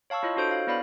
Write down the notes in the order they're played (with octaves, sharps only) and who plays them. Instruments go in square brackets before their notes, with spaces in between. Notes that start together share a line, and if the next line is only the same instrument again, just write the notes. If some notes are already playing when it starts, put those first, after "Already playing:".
[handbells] C#5 F5 A5 C#6 E6
E4 F4 C#5 D#5
D4 F#4 A4 C5 G6 D7
C#5 F5
B3 E4 B4 D5 F5 B5